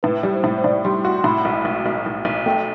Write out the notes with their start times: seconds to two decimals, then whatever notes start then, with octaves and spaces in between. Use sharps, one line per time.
0.03 A2 B4
0.23 G3
0.34 C5
0.44 A2
0.58 C5
0.64 A2 D5
0.84 G3 C6
1.04 F#4 C6
1.18 C6
1.24 A2 B5
1.45 B1
1.65 B1
1.86 B1
2.06 B1
2.25 B1
2.46 A3 G5